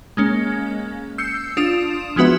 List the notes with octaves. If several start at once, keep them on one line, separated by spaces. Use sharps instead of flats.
G#3 A#3 C#4
E6 G6 C7 C#7
D4 F4 D#6 E7
F3 G#3 B3 F#4 B4 E5